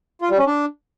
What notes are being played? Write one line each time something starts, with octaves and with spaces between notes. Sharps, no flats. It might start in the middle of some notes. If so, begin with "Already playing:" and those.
F4
G3
C#4
D4